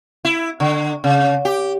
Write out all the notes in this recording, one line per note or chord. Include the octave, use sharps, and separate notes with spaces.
E4
D3
C#3
G4